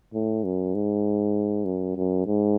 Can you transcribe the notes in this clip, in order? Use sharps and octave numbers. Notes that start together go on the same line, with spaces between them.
A2
F#2
G#2
F#2
F#2
G#2